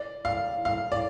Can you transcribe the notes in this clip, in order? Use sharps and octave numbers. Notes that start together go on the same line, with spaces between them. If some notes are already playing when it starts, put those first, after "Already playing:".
Already playing: D5
F5
F5
D5